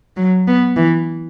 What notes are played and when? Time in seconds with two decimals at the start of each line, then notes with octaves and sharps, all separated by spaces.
0.17 F#3
0.48 B3
0.77 E3